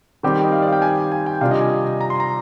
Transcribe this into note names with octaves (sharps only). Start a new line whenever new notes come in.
D#3 G3 C4 G4
D#5
F5
D5
F5
G5
G#5
G#5
G5
C3 G3 D4 F4 F5
D#5
G#5
A#5
C6
A#5